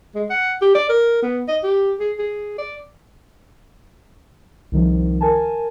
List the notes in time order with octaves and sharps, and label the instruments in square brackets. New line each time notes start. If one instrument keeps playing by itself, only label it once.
[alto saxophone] G#3
F#5
G4
D5
A#4
B3
D#5
G4
G#4
G#4
D5
[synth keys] C2 D#3 F3
A#4 G#5 A5